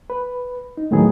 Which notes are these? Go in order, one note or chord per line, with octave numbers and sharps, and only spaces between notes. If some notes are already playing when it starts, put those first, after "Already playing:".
B4
D#4
D#2 A2 D#3 F#3 B3 G#4